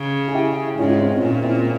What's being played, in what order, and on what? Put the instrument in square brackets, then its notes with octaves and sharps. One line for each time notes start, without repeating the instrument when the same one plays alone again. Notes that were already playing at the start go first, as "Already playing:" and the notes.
Already playing: [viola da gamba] C#3
[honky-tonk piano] G#4
E4 G4
[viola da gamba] G#2 [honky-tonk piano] C#4 F4
[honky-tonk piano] C#4 F4
C4
C4
[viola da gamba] A#2 [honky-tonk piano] A#3 C#4
[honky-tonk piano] C4 E4